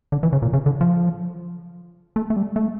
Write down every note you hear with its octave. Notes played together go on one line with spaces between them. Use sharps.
D3
E3
C#3
A#2
C#3
D3
F3
A3
A3
G3
A3